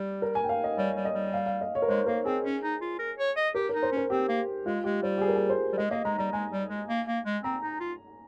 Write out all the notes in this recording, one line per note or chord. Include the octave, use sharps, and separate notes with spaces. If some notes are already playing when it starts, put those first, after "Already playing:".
Already playing: G3 G4
A#4
G#5
G5
F5
D#5
G3 C#5
G3
D#5
G3
F5
F5
D#5
C#5
A#4
G#3 C5
A#3 A#4
C4 G#4
C#4
D#4
F4
A#4
C#5
D#5
G4 A#4
D#4 A#4
C5
C#4 A#4
C4 G4
A#3
G#3 F4
G#3 G4
G3 C5
G4
G#4
A#4
G#4
C5
G3
G#3 D#5
A#3 D#5
G#3 A#5
G3 A#5
G#3 G#5
G3
G#3
A#3
A#3
G#3
C4 A#5
D#4
F4